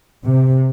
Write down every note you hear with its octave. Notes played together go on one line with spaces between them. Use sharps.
C3